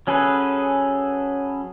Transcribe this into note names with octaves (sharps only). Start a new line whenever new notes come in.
F#3 C#4 G#4 A4 B4